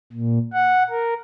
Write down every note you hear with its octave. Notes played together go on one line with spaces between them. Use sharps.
A#2
F#5
A#4